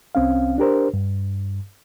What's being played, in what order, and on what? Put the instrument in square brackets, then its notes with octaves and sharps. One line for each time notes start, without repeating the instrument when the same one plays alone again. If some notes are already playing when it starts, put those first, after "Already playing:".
[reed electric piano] C2 C4 C#4 F5
D4 G4 A#4 C5
G2